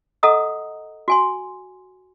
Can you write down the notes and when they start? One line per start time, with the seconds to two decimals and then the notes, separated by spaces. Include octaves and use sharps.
0.23 A4 D#5 F#5 A#5 D#6 E6
1.08 F#4 G#5 C6